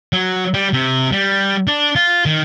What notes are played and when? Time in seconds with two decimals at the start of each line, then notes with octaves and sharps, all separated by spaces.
0.13 F#3
0.54 G3
0.73 C3
1.12 G3
1.67 D4
1.96 F4
2.26 D#3